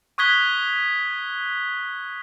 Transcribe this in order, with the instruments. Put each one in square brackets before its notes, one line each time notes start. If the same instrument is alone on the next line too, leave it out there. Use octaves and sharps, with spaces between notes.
[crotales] C#6 D#6 F#6 G#6 B6 G7